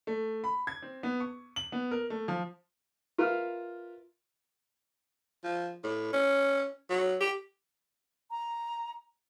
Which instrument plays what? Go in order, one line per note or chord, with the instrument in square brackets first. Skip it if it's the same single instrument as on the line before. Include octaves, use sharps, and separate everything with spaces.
[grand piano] A3
B5
G#6
C4
B3
C#6
F#7
B3
A#4
A3
F3
[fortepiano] F4 A#4 B4 E5 F5 F6
[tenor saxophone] F3
A2
C#4
F#3
G4
[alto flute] A#5